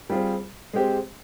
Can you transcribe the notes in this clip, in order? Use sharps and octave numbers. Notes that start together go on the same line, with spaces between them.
G3 C4 F4 G#4
G#3 C4 G4